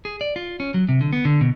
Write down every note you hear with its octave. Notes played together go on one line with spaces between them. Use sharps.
G#4
D5
F4
C#4
F#3
C3
D3
B3
D3
B2